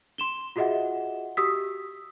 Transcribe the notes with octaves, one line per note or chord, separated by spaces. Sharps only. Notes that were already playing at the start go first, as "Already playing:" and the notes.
C6 E7 G7
F4 F#4 G#4 D#5 E5 F#5
F#4 G4 D#6 E6 B6